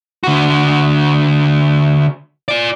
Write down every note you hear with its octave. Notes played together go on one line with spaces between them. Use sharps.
D3 F#4
F4 D5